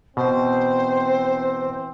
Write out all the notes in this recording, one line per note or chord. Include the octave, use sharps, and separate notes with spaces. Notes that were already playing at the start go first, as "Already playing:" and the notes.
B2 E3 C4 C5